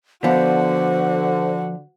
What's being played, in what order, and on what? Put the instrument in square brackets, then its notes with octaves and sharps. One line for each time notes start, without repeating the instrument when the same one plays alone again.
[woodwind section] D3 [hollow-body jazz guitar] F3 B3 [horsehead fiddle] F#4 [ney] C5